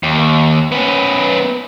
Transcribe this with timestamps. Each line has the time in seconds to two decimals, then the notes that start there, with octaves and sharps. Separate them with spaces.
0.03 D#2
0.72 B3 C#4